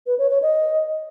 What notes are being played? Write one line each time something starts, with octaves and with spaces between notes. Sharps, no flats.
B4
C#5
C#5
D#5